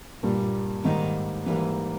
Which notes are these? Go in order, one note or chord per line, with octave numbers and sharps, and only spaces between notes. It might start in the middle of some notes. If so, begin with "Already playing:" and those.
G2 A#2 G3 A#3
G#2 D#3 G3 A#3 D#4
G#2 E3 G3 A#3